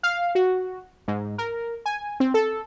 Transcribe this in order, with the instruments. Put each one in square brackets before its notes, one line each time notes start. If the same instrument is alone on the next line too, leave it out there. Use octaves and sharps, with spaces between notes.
[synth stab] F5
F#4
G#2
A#4
G#5
C4
A4